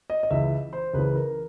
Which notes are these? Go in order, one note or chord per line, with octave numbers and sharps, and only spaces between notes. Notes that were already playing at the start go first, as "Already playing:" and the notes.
D#5
D#5
C#2 C#3 E3 E5
C5
C#2 C#3 E3 B4
A#4